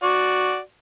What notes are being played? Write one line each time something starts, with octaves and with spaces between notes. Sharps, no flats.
F#4 D5